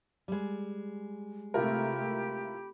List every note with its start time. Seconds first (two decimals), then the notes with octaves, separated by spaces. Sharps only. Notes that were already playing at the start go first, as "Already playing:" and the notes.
0.28 G3 G#3
1.54 C3 A3 E4 F4 G4 A#4 B5